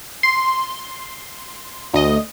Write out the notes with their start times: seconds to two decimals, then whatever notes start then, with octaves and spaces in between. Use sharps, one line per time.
0.23 C6
1.94 D2 D#5